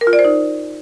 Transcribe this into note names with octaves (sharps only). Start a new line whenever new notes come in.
A#4
F4
D5
C5
D#4